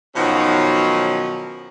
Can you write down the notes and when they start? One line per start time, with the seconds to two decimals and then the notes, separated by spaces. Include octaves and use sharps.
0.16 B2 D#3 F3 F#3 C#4 D#4